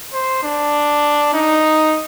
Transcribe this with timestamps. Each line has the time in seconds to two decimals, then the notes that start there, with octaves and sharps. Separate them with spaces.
0.13 C5
0.43 D4
1.34 D#4